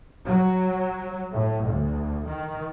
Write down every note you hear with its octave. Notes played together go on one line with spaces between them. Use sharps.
F#3
A2
D2
D#3